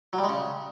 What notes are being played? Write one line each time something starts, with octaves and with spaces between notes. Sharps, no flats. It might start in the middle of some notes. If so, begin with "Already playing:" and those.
F#3
G3
G#3
C#3